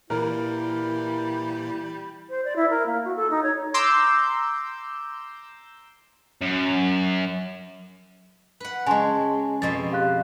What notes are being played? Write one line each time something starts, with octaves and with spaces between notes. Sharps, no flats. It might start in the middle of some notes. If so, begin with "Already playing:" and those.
A#2 E3 G3 E4 A#4
C5
D5
E4
A#4
A#3
F#4
A4
D#4
C#5
A#5 C6 D6 E6 G6
F#2
B4 F#5
C#3 G#3 G#5 A5 C6
F2 B2 C6 A6
G4 F5 F#6